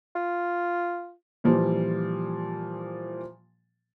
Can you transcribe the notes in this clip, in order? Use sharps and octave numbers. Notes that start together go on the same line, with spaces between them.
F4
A#2 E3 F3 G3